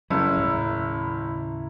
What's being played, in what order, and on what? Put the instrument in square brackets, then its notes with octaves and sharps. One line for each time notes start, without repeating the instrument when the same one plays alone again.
[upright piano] F#1 [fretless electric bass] G3 [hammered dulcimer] E4 A#4
[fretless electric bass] D#2 A2 C#3